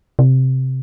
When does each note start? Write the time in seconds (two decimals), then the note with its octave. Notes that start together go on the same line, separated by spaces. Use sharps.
0.19 C3